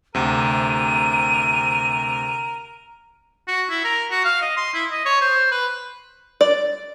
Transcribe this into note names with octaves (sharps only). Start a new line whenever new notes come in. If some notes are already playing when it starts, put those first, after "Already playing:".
D2 C3 A#4 D#7
F#4
E4
A#4
F#4
F5
D#5
C6
E4
D#5
C#5
C5
B4
D5